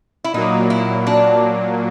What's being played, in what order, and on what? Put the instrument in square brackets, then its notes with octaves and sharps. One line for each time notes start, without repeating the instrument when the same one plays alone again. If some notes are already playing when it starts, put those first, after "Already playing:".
[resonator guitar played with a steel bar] E4
[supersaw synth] A#2 F#3 A#3 [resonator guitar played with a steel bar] D#4
[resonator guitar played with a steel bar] E4
D4